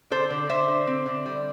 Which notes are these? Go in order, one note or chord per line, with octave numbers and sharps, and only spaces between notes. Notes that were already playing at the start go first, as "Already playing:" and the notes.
D3 A4 C5
D3
D3 C5 E5
D3
C4
D3
G3